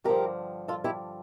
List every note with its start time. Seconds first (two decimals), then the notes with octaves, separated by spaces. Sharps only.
0.04 G2 D3 F3 G4 A#4
0.68 F4 A4
0.84 E4 G4